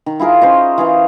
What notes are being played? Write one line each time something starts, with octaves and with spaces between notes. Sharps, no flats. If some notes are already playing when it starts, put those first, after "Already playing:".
D#3
E4 F4 G#4 A#4
C#4 C5 C#5 D#5
E3 G#4 F5